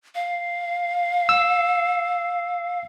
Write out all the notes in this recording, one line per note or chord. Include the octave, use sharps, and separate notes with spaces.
F5
E6